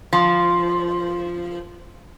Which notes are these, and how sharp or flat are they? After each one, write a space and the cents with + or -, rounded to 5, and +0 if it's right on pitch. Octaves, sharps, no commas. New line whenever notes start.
F3 -5